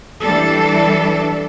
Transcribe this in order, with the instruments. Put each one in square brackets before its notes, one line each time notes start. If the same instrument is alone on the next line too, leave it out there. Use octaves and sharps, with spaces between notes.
[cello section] E3 G3 D4 A4